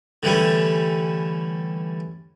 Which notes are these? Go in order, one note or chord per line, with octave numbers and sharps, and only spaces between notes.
D3 E3 G3 A3 C#4